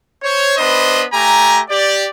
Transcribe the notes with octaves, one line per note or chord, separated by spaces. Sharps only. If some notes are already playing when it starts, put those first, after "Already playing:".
C5 C#5
B3 D4 B4 C5 D#5
A3 G4 G#5 A#5
G4 D5